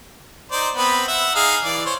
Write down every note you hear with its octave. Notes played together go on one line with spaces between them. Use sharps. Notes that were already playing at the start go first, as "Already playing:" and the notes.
D#4 C5 D5
B3 C4 B5
E5 F#5
D#4 G#4 F5
E3 D5
C5 C#5